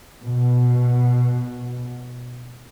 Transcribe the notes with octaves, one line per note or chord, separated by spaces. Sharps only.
B2